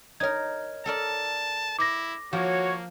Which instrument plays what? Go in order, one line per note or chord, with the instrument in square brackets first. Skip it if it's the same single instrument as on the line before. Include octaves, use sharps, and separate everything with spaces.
[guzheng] D#4 A#4 [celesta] C#5 G#6
[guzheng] A4 A#4 D5 [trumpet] A5
[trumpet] E4 [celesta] D6 A#6
[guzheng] F3 [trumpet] A#3 [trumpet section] F#4 C#5